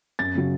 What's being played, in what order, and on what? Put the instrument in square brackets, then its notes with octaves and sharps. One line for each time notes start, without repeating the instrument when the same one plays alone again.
[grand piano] F#2 A6
C#3 F#3